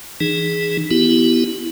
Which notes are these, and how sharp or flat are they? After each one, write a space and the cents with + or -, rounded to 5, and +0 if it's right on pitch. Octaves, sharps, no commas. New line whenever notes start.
E3 +0 D#4 -20 G#4 +0
B3 +0 E4 +0 G4 -25